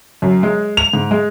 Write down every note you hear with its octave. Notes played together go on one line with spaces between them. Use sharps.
F#2
G#3
F7
G#2
G#3